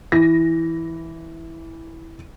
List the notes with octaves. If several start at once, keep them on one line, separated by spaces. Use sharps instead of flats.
E3 A#6